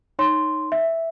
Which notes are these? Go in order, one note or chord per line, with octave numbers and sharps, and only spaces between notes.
D#4 C#5 C6
E5